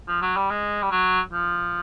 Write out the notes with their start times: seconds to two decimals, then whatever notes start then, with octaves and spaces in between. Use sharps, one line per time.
0.08 F3
0.22 F#3
0.36 G3
0.50 G#3
0.82 G3
0.91 F#3
1.33 F3